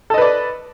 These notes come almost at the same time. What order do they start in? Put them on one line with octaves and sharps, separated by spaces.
A4 D#5 B4 D5